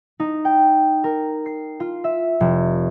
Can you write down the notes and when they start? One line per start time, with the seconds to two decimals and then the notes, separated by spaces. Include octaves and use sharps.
0.20 D#4
0.45 G5
1.04 A#4
1.46 C7
1.80 F4
2.04 E5
2.40 F1